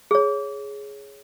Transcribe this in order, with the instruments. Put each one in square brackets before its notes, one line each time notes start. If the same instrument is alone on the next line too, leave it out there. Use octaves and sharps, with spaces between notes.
[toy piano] G#4 C#5